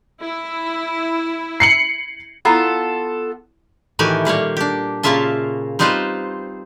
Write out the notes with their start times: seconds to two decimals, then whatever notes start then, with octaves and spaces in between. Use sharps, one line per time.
0.22 E4
1.60 C7 C#7 F#7
2.45 B3 E4 F4 A4 A#5 B5
3.99 A2 D#3 E3 F#4 G4 G#5
4.25 A#2 G3 A#3 C#5
4.57 D4 G4
5.03 A#2 C#3 A#3 F4 E5 A5
5.79 G3 C4 D#4 F4 B4 C5